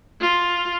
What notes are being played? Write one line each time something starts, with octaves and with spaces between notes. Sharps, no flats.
F4